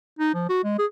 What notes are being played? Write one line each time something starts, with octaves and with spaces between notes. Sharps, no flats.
D#4
F3
F#4
G#3
G#4